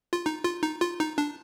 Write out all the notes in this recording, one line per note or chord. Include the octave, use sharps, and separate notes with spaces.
F4
D#4
F4
D#4
F4
D#4
D4